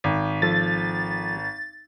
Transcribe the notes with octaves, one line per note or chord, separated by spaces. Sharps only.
G#1
F3 A4 A6